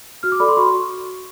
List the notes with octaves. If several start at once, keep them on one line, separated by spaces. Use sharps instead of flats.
F#4 F6
D6
A4 D5 B5
C6
F#4 C#6